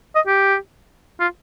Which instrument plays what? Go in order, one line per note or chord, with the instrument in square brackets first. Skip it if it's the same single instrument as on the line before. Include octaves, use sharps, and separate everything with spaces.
[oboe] D#5
G4
F4